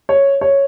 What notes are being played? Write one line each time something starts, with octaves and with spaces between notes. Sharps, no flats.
C#5
C#5